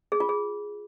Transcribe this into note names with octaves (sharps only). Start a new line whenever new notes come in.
G#4
F4
G#4